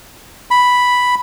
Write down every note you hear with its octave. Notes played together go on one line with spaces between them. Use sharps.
B5